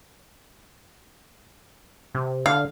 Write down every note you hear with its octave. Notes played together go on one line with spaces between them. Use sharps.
C3
D3 F5